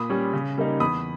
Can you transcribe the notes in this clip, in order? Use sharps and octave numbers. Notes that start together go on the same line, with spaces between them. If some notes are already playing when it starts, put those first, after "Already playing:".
Already playing: A#2 B5 D#6
G3 C#4
C#3
G3 A#3 D#4
E2 B5 D#6